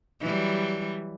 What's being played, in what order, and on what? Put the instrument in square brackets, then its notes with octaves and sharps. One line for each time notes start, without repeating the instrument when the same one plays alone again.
[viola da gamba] E3 F#3 G3